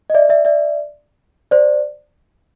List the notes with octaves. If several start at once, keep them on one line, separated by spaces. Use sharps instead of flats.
D#5
D5 E5
D5 E5
D5 E5
C5 D5